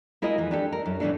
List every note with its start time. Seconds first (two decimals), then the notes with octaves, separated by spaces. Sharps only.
0.22 G#3 E4 F4 A#4 D#5
0.38 F2 E3
0.51 D4 G4 A4
0.72 A#4
0.86 F#2
1.00 A2 E3 A3 B3 D4 A4